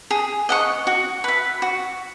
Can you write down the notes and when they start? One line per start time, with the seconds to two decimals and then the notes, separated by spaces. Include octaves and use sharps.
0.11 G#4
0.49 D#5 F#5 C#6
0.87 F#4
1.24 B4 E5
1.62 F#4